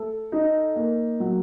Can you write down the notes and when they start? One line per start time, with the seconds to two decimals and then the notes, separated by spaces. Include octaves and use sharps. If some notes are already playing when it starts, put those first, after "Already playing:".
Already playing: A3 A4
0.32 D#4
0.76 A#3
1.20 F#3